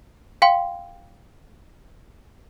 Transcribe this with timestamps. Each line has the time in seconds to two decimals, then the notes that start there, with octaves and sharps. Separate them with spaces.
0.42 F5 G5 C6